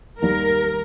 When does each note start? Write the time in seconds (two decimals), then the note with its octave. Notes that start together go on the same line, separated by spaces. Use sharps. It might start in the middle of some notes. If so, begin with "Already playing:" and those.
0.22 D#2 D#3 G3 A#4